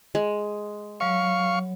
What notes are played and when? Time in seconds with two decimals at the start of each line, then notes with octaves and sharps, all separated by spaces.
0.15 G#3
1.00 F#3 C#5 F5 C#6